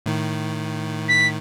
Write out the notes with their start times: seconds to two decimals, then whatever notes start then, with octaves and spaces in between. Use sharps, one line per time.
0.06 A2 D#3
1.08 B6